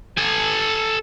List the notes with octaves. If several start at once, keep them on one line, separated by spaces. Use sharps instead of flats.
A4 G#5